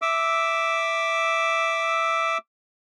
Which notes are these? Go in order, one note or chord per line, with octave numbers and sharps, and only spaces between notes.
E5 D6 E6